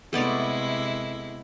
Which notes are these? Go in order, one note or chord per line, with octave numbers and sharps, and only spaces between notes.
C3 G#3 A3 B3 E4 D5